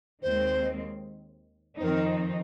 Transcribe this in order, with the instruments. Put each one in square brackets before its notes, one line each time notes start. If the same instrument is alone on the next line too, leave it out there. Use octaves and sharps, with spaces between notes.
[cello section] D#2 D#3 G#3 C4 [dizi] C5
[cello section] F2 D#3 C4 D#4 [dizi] C5
[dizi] A#4